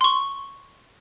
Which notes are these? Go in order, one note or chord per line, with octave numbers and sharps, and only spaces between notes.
C6 C#6